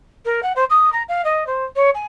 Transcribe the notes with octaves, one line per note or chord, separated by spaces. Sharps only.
A#4
F#5
C5
D#6
A#5
F5
D#5
C5
C#5
G#5